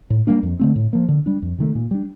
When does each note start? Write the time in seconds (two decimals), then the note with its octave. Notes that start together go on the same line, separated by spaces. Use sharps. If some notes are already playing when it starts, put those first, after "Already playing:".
0.10 A2
0.27 G3 A#3 D4
0.43 F2
0.59 D3 A3 C4
0.76 A2
0.93 F3 A#3
1.09 D3
1.26 G3 D4
1.42 F2
1.58 C3 D#3 A3
1.75 A#2
1.91 G3 D4